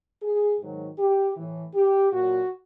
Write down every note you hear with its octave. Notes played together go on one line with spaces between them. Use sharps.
G#4
G#2 D#3 F#3
G4
A2 E3
G4
A#2 F#3 F#4